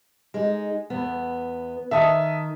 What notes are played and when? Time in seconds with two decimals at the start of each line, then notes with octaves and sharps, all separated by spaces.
0.34 G#3 D#4
0.90 E2 B3
1.91 D#3 E5 A5 D#6